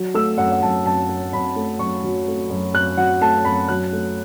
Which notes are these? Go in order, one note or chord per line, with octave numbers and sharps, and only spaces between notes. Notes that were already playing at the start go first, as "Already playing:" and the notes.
Already playing: F#3
A3 E6
F#2 F#5
F#5
F#2 A5
F#2 A5
F#2
F#2 B5
A3
F#2 C#6
F#3
A3
F#2
F#2 F#6
F#3 F#5
A3 A5
F#2 B5
F#3 F#6
A3